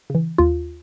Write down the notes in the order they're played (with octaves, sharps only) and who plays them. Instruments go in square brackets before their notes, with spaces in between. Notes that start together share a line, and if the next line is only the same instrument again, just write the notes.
[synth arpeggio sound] C#3 E3
D#2 F4